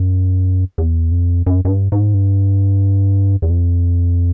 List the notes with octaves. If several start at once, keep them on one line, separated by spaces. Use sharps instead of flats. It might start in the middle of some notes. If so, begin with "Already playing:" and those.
Already playing: F#2
E2
F2
F#2
F#2
G2
G#2
G2
E2
F2